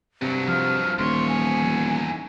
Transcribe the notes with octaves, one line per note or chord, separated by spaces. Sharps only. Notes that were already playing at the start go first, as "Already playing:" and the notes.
G2 C3 F#3
F3 F6
D#1 E2 C#5 C6
G#5